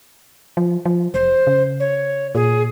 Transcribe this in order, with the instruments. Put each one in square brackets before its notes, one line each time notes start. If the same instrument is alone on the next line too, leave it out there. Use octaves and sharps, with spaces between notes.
[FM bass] F3
F3
[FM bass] F1 [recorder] C5
[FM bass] C#3
[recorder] C#5
[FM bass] A#2 [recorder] G#4